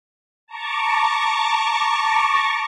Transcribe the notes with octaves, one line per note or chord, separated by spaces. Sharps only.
A5 A#5 C#6 D6